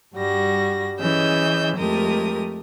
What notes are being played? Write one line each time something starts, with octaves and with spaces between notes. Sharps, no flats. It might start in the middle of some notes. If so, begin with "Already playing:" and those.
G2 G3 F#4 A#6
E3 C#4 G#4 D#5 E6 G6
F2 G#3 A3 G4 A#4 D#6